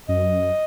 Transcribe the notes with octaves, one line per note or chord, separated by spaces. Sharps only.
F#2 D#5